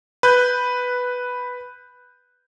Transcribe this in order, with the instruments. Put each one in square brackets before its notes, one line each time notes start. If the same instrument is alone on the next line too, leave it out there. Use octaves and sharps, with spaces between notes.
[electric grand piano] B4 F#6 G6